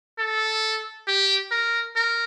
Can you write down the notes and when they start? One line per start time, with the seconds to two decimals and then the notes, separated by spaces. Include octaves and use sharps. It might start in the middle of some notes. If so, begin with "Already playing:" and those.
0.19 A4
1.08 G4
1.51 A#4
1.96 A#4